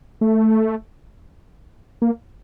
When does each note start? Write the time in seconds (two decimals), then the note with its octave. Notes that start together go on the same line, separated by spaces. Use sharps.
0.21 A3
2.02 A#3